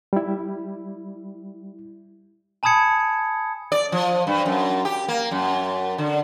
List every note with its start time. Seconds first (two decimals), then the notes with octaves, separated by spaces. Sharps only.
0.13 G3 E4
2.63 G#5 A5 B5 D#6 G#6 C#7
3.72 D5
3.92 F3
4.27 G2
4.46 F#2
4.85 G4
5.08 A#3
5.31 F#2
5.98 D3